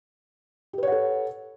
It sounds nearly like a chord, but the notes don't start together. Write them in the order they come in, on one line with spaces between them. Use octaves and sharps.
G4 B4 C#5 F#5 A4